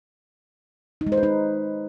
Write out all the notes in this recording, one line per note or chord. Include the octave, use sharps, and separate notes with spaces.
D#4
G#3
C5
B4
D#4